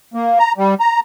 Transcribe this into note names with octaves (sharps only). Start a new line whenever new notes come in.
A#3
A#5
G3
A#5